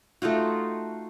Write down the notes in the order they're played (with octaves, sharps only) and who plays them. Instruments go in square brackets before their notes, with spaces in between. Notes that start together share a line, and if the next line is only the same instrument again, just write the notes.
[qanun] A3 D#4 F4 F#4